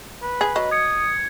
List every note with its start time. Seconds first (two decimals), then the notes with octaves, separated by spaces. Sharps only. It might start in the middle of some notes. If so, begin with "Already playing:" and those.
0.23 B4
0.41 G#4
0.56 F#3 D#5
0.71 D#6 G#6 C#7